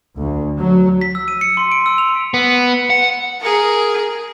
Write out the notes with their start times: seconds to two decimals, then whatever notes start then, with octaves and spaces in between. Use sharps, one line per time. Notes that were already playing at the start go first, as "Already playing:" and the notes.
0.18 D2
0.57 F#3
1.01 B6
1.15 E6
1.28 D#7
1.41 C#7
1.57 C6
1.72 D7
1.86 E6
1.98 F7
2.34 B3
2.90 F#5
3.40 G#4 A#4